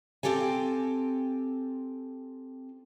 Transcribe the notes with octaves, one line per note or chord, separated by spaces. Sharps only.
C4 F4 G4 A4 G#5